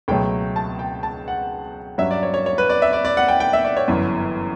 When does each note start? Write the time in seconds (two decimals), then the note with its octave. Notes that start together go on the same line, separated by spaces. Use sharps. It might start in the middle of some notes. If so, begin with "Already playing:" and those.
0.08 C#2 B2 F#3 A3 G5
0.56 A5
0.79 G5
1.03 A5
1.28 F#5
1.98 G2 F#3 C#4 E5
2.11 D5
2.23 C#5
2.34 C#5
2.46 C#5
2.58 B4
2.69 D5
2.82 E5
2.93 D5
3.05 D5
3.17 F#5
3.28 G5
3.40 G5
3.53 E5
3.65 D5
3.77 C#5
3.88 G1 F#2 E3